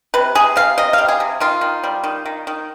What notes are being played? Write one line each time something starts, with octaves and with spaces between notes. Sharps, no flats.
C3 B4
C3 G#4
C3 F5
C3 D#5
G3 F5
G#4
C3
D#3 F4
D#3
G3
D#3
D#3
D#3